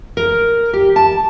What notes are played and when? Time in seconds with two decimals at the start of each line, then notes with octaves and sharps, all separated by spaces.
0.17 A#4
0.73 G4
0.96 A5